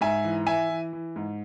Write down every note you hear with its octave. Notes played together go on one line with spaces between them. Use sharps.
G#2 E5 G#5
E3
E3 E5 G#5
E3
E3
G#2